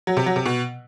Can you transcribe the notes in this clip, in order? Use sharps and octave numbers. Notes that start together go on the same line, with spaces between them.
F#3
C3
F#3
C3
B2